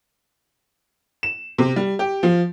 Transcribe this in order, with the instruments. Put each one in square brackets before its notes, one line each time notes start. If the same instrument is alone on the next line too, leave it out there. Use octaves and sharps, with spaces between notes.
[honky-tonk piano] E7
C3
G3
G4
F3